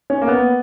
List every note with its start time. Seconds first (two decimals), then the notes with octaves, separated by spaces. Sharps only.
0.10 C#4
0.22 A#3
0.28 B3